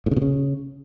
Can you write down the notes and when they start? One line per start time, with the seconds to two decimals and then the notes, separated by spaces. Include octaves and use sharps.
0.06 A2
0.11 C#3
0.16 B2
0.22 C#3